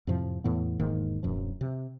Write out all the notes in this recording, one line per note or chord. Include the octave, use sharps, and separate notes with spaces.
F2 A2 C3 F3
E2 A2 E3 B3
E1 G#2 D#3 A#3
D1 F#2 B2 F3
C3